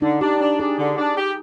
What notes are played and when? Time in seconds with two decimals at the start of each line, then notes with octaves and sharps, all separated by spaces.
0.01 D3 D#4
0.21 D4 G4
0.40 D4
0.60 D4 G#4
0.78 D3
0.98 D4
1.17 G4